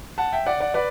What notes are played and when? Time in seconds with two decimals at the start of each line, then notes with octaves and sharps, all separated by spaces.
0.18 F#5 A5
0.32 E5 G5
0.46 D5 F#5
0.61 D5 F#5
0.74 B4 D5